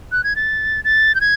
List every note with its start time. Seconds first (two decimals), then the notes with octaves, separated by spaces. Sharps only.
0.12 F#6
0.24 G#6
0.36 A6
0.84 A6
1.15 G6
1.21 G#6